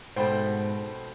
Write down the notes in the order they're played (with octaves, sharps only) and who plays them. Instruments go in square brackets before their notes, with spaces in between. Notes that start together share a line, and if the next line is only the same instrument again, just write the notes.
[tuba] G#2 [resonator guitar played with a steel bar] B2 A3 [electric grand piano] C5 G5 B5